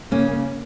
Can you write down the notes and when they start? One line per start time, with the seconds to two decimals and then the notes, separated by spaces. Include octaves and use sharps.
0.11 C#3 A#3 C#4